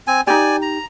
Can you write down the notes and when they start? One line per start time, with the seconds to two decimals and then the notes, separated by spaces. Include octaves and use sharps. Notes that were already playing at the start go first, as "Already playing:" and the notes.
0.07 C4 G#5
0.27 D#4 G4 D5 G#5
0.62 A#5